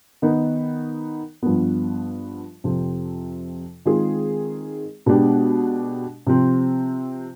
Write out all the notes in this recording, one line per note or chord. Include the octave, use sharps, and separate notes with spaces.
D#3 B3 D#4
G2 F3 B3
F2 C3 F3 C4
D#3 G#3 C4 F4 G#4
B2 G#3 B3 D4 G4
C3 F3 C4